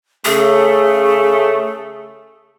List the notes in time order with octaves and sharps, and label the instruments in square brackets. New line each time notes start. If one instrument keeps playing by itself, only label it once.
[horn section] C#3 A3 [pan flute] G#4